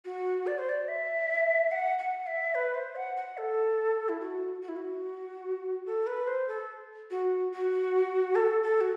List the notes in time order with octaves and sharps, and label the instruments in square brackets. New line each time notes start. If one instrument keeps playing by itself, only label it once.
[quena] F#4
D5
C5
D5
E5
F#5
F#5
E5
B4
C5
F#5
F#5
A4
E4
F#4
F#4
E4
F#4
A4
B4
C5
A4
F#4
F#4
A4
A4
F#4